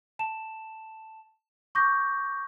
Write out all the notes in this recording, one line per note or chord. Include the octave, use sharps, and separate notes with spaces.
A5 E7
C#6 D6 G6 A#6